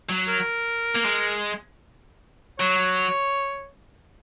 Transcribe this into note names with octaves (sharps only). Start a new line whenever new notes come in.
F#3
A#4
A#3
G#3
F#3 C#5